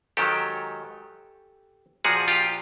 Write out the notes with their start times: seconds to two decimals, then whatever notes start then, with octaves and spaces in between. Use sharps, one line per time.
0.17 G#2 D#3 F#3 G4 A4
2.04 A#2 F3 F#4 G#4
2.28 F4 G4